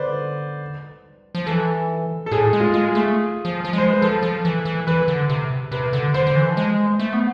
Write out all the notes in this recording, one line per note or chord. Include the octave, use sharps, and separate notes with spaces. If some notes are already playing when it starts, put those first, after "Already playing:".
Already playing: D3 B4 C5 D5
F3
E3 A4
A4
A2 G#4
G#3
F4
G#3
G#4
A3
F3
F3
G#3 C5
B4
F3 A4
F3
E3
E3
E3 B4
D3
C3
C3 B4
D3
D3 C5
D3
E3
F3
G#3
A3
B3